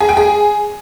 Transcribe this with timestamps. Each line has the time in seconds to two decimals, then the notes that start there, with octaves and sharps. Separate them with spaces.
0.01 G#4
0.09 G5
0.17 G#4